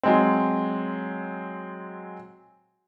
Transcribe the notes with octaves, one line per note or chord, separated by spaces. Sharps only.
F#3 G#3 C4